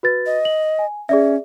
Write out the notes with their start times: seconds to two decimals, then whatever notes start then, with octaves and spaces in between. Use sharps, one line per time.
0.03 F#4 B4 A6
0.26 D#5
0.45 F#7
0.79 G#5
1.09 C#4 G#4 D5 E5